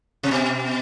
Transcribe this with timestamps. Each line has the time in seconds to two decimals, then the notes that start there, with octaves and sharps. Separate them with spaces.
0.23 C3
0.31 B2